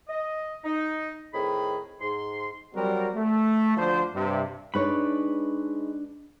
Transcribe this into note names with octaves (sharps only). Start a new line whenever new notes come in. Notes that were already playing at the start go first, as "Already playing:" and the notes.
D#5
D#4
A2 D#3 C4 G#4 B5
G#2 C6
F#3 G3 C4 F#4 A#4
A3
D2 F3 D4 C5
G2 C3
G#3 D4 D#4 B4 C#5 B5